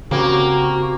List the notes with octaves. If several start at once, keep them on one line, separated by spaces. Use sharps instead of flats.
C#3 A#3 C4 F#4 G4